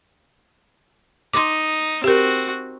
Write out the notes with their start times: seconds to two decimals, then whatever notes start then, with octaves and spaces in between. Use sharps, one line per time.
1.34 D#4 C6 D6
2.04 C4 F#4 G4 A#4